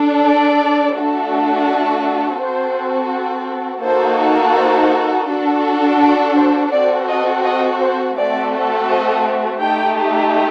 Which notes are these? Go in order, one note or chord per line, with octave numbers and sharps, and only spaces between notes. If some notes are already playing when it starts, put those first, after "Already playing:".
Already playing: D4 A4
D5
A3 D4 F#4 A4
C4 F#4 A4 C5
A#3 D#4 F#4 A4 C5
C5
D4 F#4 A4
D5
C5
C4 F#4 A4 D5
D#5
D#5
C5
A3 C4 F#4 A4 D5
D#5
A3 D#4 G4 G5